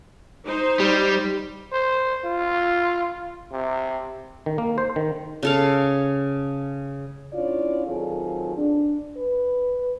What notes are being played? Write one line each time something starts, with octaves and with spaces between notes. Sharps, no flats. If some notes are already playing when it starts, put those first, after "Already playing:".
D#4 C5
G3
C5
F4
C3
D#3
A#3
C5
D#3
C#3 A4 F5
C#4 D4 E4 F4 C#5 D5
D#3 F#3 C4 F4 G#4 A4
D4
B4